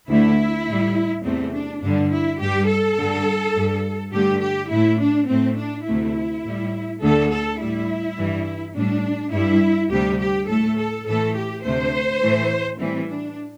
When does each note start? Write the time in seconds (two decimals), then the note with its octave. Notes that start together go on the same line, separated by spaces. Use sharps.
0.09 D2 D3 A3 E4
0.66 A2 G3
1.24 E2 C3 A3 C4
1.54 D4
1.82 G2 D3 G3 D4
2.11 E4
2.40 G2 G3 G4
2.68 A4
2.98 G2 D3 G3
3.56 G2 G3
4.13 G2 D3 A3 G4
4.42 G4
4.71 A2 A3 E4
5.00 D4
5.28 A2 A3 C4
5.58 D4
5.86 D2 C3 A3 E4
6.44 A2 G3
7.02 D2 D3 A3 A4
7.31 A4
7.60 A2 G3 E4
8.18 G2 E3 G3
8.75 A2 G3 D4
9.33 G2 G3 E4
9.90 D2 C3 G3 G4
10.20 G4
10.48 A2 A3 A4
10.77 A4
11.07 A2 E3 A3 A4
11.36 G4
11.64 D2 C3 A3 C5
12.22 A2 E3 A3
12.80 A2 E3 G3 C4
13.09 D4